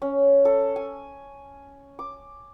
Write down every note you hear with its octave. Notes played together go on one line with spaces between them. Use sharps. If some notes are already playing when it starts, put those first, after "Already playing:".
C#4
A4
G#5
D6